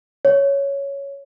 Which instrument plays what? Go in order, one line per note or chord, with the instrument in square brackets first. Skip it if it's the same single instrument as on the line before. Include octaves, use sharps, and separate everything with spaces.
[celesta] C#5